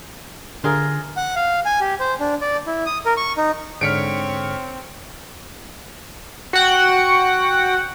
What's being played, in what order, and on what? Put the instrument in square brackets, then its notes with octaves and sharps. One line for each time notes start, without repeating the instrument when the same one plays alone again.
[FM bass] D3 [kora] F4 G#4 A#4
[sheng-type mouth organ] F#5
F5
G#5
G4
C5
D4
D5
E4
D#6
A#4
C#6
D#4
[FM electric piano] G#2 D3 B6 [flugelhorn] C4 [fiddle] C#5 [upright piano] F6 C#7 D7
[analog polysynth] F#4 F#5 G5